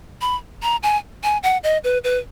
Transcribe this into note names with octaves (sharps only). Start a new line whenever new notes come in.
B5
A#5
G#5
G#5
F#5
D#5
B4
B4